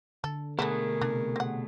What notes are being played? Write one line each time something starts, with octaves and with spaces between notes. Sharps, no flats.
D3 A4
B2 D3 F#3 A3 E4 G#4 A#4
C3 D4 G#4
C4 F#5